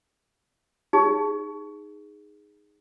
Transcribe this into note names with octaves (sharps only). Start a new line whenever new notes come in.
D#4 G#4